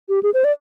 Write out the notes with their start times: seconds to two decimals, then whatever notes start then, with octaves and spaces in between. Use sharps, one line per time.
0.09 G4
0.23 G#4
0.34 C5
0.44 D5